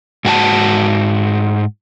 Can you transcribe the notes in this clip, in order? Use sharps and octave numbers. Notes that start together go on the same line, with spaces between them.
G#2 F#4 G#5 A5